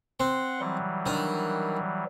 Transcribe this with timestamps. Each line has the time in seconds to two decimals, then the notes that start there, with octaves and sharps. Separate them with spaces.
0.20 C4 F#5 C6
0.60 E3 F#3 G3
1.06 D#3 D4